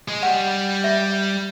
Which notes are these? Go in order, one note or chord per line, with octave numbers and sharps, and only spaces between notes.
G#3
G3 F#5
E5